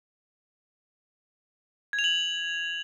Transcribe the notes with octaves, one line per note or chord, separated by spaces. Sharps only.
G#6
F7
F#7